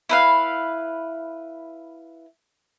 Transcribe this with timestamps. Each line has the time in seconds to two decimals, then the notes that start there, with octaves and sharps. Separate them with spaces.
0.09 E4 B4 F5